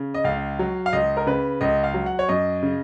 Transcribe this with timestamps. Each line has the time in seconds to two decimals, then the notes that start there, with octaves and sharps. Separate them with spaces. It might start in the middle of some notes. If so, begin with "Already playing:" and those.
Already playing: C#3
0.14 D#5
0.24 C#2 F5
0.59 F#3
0.86 F5
0.93 C#2 D#5
1.17 A#4
1.27 C#3 B4
1.61 C#2 D#5
1.84 F5
1.94 F#3
2.06 F#5
2.19 C#5
2.29 F#2 D#5
2.63 C#3